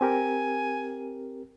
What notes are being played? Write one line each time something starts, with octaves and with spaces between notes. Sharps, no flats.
C4 G4 A#4 G#5